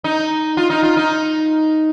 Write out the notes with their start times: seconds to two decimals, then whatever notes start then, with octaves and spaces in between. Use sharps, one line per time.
0.04 D#4
0.57 F4
0.70 D#4
0.83 F4
0.97 D#4